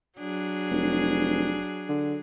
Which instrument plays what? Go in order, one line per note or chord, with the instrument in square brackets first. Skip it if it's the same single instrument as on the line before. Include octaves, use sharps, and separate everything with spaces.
[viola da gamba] F#3 D4 G#4
[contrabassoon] F1
D3